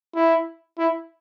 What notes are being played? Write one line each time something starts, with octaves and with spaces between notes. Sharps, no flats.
E4
E4